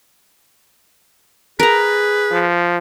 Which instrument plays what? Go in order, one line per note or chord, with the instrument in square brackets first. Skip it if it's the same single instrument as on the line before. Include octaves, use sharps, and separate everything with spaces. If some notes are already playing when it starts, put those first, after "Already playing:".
[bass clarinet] G#4 [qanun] A#4 A#5 [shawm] B4
[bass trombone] F3